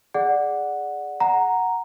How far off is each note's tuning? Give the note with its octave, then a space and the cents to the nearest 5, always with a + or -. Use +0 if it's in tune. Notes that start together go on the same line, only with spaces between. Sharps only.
G#4 +0 D5 +0 F#5 -5
F#5 +0 A#5 +0